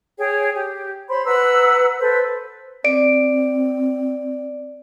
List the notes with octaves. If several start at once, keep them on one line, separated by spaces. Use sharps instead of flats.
G#4 C#5 G5
G4
C5 C#5 B5 C6
B4 F#5 A#5 E6
A4 B4 C5
C4 D5 D7